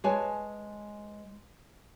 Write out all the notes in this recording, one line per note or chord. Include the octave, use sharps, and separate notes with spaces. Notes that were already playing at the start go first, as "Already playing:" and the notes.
G#3 B4 C#5 G#5 A5